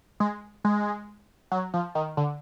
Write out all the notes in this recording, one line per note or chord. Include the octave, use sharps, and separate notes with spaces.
G#3
G#3
F#3
F3
D#3
D3